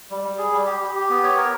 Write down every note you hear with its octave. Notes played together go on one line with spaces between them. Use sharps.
G3
G3
G#4
G3
G4
G4
G4
B3
C#5
A#4